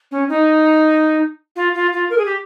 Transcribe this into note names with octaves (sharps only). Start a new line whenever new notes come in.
C#4
D#4
F4
F4
F4
A#4
G#4
G4